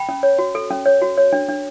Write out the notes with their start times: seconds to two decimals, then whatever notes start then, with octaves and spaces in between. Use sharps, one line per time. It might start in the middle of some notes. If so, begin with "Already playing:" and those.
Already playing: G5 B5
0.09 C#4
0.23 C#5
0.39 F#4
0.55 A4
0.70 C#4
0.86 C#5
1.02 F#4
1.18 C#5
1.33 D4
1.49 D4